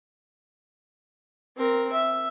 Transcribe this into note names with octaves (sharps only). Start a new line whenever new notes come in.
C4 A#4
E5